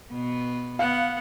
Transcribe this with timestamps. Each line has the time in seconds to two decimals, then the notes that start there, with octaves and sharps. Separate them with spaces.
0.11 B2 B3
0.79 B3 F5 F#5